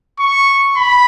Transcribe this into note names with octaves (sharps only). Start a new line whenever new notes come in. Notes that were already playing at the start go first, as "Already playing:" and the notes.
C#6
B5